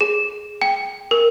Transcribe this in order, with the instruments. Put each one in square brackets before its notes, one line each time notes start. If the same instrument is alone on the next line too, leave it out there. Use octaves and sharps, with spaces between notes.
[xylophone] G#4
G5
A#4